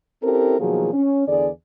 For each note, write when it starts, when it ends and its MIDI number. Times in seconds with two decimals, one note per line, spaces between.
0.23 0.56 60
0.23 0.56 61
0.23 0.56 64
0.23 0.56 67
0.23 0.56 69
0.23 0.56 70
0.60 0.90 47
0.60 0.90 51
0.60 0.90 53
0.60 0.90 54
0.60 0.90 58
0.60 0.90 68
0.93 1.24 61
1.28 1.49 40
1.28 1.49 50
1.28 1.49 68
1.28 1.49 74